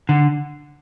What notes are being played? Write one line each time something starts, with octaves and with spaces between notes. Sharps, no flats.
D3